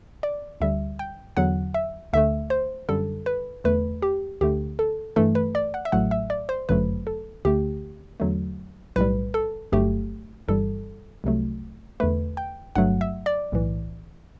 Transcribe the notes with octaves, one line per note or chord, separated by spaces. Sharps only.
D5
D2 D3 G3 E5
G5
E2 D3 F#3 F#5
E5
D2 D3 A3 E5
C5
F#2 D3 G3 A4
B4
E2 D3 A3 B4
G4
D2 D3 A3 G4
A4
G2 E3 A3 A4
B4
D5
F#5
E5
A1 A2 F#3 A3 F#5
E5
D5
C5
G1 F#2 D3 F#3 A3 B4
A4
D2 D3 A3 G4
E2 D3 F#3 A3
B1 A2 G3 B4
A4
G1 G2 F#3 A3 G4
G1 G2 E3 G3 A4
C2 C3 F#3 A3
E2 D3 A3 B4
G5
G1 G2 F#3 A3 F#5
E5
D5
B1 A2 E3